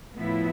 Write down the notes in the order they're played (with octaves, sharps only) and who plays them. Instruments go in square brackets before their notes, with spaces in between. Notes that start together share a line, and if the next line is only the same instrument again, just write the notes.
[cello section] A2 F3 B3 E4